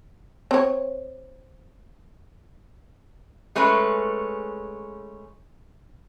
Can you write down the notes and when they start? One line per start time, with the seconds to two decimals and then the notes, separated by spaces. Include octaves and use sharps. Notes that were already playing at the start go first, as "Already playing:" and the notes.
0.51 C4 C#5
3.55 G#3 A3 C#4 G#4 B4